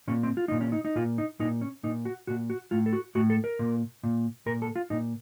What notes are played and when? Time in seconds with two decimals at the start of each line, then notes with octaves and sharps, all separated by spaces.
0.07 A#2 C#4
0.23 C4
0.37 F4
0.48 A#2 D#4
0.61 C#4
0.72 D#4
0.85 D#4
0.96 A#2 F4
1.18 D#4
1.40 A#2 D#4
1.61 C#4
1.83 A#2 D#4
2.05 F#4
2.27 A#2 F#4
2.50 F#4
2.71 A2 F4
2.86 A4
2.93 F#4
3.15 A2 F#4
3.30 A4
3.44 A#4
3.59 A#2
4.03 A#2
4.46 A#2 A#4
4.62 A4
4.76 F4
4.90 A#2 D#4